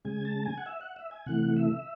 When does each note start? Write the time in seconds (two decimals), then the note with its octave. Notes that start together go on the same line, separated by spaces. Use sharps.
0.05 C#3 G#3 G#5
0.25 A5
0.45 G#5
0.58 F#5
0.66 E5
0.81 F#5
0.96 E5
1.11 G#5
1.26 C3 E3 A3 F#5
1.57 E5